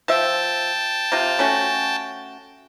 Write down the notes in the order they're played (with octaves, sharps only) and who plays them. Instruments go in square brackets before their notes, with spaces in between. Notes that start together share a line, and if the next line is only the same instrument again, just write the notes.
[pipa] F3 E5 [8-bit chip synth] G5 A5
[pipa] C3 F4
A3 C#4 F#4